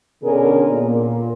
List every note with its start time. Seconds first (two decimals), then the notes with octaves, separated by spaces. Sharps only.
0.23 B2 D3 C#4 G#4 A#4
0.71 A#2